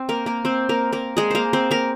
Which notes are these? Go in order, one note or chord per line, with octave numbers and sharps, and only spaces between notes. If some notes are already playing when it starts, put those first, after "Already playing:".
Already playing: C4 C5
A#3 A#4
A#3 A#4
C4 C5
A#3 A#4
A#3 A#4
G#3 G#4
A#3 A#4 C5
C4 C5
A#3 A#4